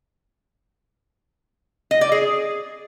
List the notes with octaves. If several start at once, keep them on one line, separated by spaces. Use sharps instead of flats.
D#5
D5
G#4